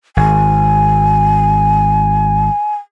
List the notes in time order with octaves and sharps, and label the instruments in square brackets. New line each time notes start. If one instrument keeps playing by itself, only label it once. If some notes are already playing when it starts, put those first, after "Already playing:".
[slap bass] G#1 [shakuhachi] G#5